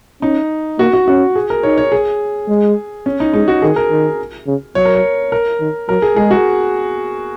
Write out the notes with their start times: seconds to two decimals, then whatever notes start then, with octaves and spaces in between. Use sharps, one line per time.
0.22 C#4 D#4
0.79 A#3 F#4
0.93 F#4
1.07 C#4 F#4
1.35 G#4
1.50 A#4
1.63 D#4 C#5
1.78 C#5
1.92 G#4
2.48 G#3
3.06 C#4
3.20 D#4
3.34 G#3 D#4
3.48 F#4
3.62 D#3 G#4
3.76 A#4
3.91 D#3
4.47 C#3
4.75 F#3 C#5
4.85 A#4
4.95 C#5
5.32 A#4
5.60 D#3
5.89 F#3 A#4
6.02 G#4
6.16 G#3 G#4
6.31 F#4